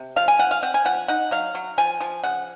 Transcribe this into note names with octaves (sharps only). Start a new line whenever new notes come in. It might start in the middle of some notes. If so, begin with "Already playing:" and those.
Already playing: C3
F3 F5
G#5
F3 F#5
F5
C4 F#5
G#5
F3 F#5
D#4 F#5
F#3 F5
F#3
F3 G#5
F3
C#3 F#5